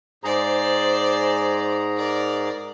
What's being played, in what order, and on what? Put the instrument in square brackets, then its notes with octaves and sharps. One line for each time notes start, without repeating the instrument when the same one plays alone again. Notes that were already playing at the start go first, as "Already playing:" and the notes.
[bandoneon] G#2 G#4 A#5 [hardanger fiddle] C5 D5
[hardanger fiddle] A#4 D5